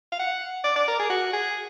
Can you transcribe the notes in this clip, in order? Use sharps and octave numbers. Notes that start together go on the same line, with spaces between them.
F5
F#5
D5
D5
A#4
G#4
F#4
G#4